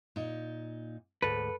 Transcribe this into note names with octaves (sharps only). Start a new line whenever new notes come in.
A#2 D#4
D2 G#2 A4 B4